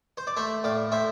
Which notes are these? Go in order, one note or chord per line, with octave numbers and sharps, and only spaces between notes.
C5
D5
A3 C5 E5
A2 D5 F5
A2 C5 E5